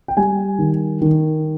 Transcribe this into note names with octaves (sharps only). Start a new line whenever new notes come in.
G5
G3 G#5
D#3
D#3